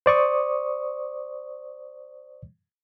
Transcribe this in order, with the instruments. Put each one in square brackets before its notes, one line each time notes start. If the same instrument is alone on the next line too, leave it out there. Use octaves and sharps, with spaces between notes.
[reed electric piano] C5 D5 C#6 D#6